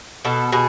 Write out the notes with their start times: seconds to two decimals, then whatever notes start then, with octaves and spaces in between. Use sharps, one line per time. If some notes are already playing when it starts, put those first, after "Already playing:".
0.25 B2 A4
0.52 B2 G#4